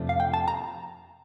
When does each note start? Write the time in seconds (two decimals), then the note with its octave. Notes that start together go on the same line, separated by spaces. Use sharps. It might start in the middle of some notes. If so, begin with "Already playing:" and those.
Already playing: F2 C3 F3 A3 D4
0.09 F5
0.20 G5
0.34 A5
0.48 A#5